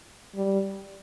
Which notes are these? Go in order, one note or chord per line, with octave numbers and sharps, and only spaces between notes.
G3